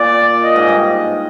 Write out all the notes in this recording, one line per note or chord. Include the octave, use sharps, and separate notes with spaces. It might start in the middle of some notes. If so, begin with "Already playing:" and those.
Already playing: A#2 D5
D#5
G#2
G2